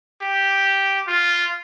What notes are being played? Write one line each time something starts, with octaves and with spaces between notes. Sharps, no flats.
G4
F4